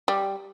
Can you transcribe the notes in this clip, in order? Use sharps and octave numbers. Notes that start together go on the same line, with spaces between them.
G3